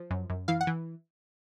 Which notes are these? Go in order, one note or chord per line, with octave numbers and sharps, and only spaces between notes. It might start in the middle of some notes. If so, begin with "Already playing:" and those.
Already playing: F3
F#2
F#2
E3 F5
F#5
E3